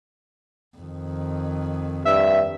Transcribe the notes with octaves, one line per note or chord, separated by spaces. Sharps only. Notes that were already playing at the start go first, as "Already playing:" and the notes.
F2 D#3
G2 E5